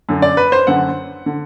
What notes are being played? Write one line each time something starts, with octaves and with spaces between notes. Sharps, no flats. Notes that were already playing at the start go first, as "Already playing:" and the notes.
F#2 D3
D5
B4
C5
F#2 D3 F#5
D3